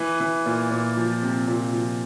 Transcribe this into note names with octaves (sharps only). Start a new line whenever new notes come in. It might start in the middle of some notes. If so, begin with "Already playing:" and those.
Already playing: E3
E3
A#2
A#2
F3
C3
A#2
F3